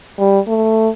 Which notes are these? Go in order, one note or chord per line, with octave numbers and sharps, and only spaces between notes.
G3
A3